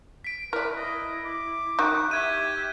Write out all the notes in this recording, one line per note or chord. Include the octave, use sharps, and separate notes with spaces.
B6 D7
E4 A#4 B4 D5
D#5
D6
D#3 F#4 F#6 G6
G4 E5 G6 G#6 D#7